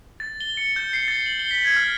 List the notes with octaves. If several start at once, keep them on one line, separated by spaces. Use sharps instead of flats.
A6
G7
C#7
G6
C7
A6
F#7
G7
B6
G#6
F6